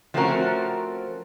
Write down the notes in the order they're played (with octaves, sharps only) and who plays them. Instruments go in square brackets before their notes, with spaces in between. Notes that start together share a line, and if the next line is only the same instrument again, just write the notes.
[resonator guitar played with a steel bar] F3 A3 C4 C#4 F#4 A#4